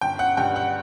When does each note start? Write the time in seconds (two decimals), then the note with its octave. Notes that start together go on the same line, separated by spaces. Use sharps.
0.01 G1 G5
0.19 F#5
0.37 G2 G5
0.56 F#5